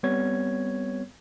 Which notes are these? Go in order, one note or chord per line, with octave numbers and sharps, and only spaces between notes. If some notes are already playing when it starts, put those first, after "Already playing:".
G3 B3 C4 C#5 G#6